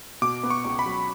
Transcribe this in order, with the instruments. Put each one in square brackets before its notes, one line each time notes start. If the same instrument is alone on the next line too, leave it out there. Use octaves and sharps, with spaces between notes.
[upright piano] B2 [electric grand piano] D6
[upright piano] B3
[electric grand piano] C#6
[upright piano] C#2
[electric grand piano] B5
[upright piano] F#3